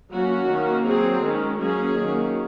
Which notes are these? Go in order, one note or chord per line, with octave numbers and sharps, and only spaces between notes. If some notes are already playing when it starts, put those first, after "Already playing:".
F#3 A#3 C#4 F#4
D#3 A#3 C#4
F#3 C4 G#4
D#3 G#3 C#4
F#3 A#3 C#4 G#4
D#3 F#3 A#3 C#4